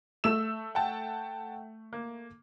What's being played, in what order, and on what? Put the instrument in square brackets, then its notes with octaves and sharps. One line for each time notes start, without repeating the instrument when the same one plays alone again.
[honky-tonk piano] A3 E6 E7
[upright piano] F#5 G5 A5
A#3